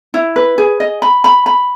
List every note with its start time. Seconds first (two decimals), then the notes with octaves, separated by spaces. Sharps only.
0.14 E4
0.36 B4
0.58 G#4
0.80 D#5
1.02 B5
1.24 B5
1.46 B5